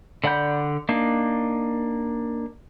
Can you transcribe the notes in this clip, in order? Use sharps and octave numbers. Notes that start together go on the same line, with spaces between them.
D3 D5 F#5 B5 G6
A#3 D4 D#4